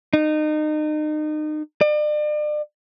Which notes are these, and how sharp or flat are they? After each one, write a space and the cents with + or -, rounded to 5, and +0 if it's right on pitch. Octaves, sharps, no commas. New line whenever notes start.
D#4 -30
D5 +40